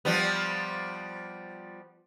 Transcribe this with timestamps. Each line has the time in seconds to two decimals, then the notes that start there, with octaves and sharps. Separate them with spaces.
0.05 F3 G3 B3